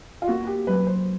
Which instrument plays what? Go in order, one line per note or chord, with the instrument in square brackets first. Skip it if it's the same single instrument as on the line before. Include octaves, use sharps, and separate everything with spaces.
[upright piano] F4
[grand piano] A#3 [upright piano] F#4
[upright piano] G4
[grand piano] F#3 [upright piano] B4
[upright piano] C5